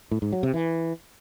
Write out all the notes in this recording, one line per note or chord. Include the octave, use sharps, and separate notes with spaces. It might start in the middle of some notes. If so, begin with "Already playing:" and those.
A2
G#2
F#3
C3
E3